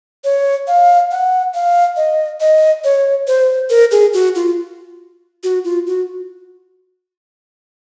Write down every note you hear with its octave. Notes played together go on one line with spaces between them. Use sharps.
C#5
F5
F#5
F5
D#5
D#5
C#5
C5
A#4
G#4
F#4
F4
F#4
F4
F#4